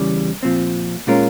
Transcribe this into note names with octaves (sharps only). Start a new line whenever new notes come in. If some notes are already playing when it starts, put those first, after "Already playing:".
Already playing: E2 C#3 E3 G3
A#2 F3 C4
A#2 G#3 C#4 F4 A#4